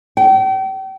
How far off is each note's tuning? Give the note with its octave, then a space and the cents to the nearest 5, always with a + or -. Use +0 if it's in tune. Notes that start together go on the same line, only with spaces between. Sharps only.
G5 -35